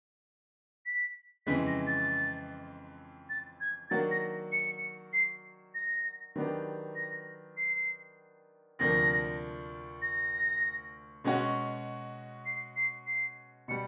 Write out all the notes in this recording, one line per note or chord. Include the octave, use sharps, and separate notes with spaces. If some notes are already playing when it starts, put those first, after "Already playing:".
B6
F2 C#3 E3 G#3 B6
A#6
A6
A6
G#6
D#3 F#3 A#3 D4 F#4 A6
A#6
C#7
C7
A#6
D#3 F#3 B3 D4 G4
A#6
C7
D2 C3 F3 A#3 D4 A#6
A#6
B2 G#3 C#4 F#4
C7
C7
C7
B2 G3 C#7